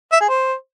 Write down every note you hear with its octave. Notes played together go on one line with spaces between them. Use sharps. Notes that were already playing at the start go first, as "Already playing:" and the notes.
E5
G#4
C5